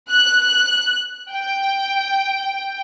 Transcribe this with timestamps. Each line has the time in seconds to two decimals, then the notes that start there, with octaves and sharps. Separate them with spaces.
0.11 F#6
1.33 G5